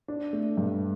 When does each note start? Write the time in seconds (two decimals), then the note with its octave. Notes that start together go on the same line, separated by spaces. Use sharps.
0.08 D4
0.33 A3
0.57 G2